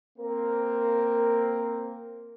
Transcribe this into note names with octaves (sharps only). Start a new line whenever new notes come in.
A#3 C4 A#4